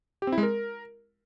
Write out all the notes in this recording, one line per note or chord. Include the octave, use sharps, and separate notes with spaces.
G4
C4
E4
G#3
A#4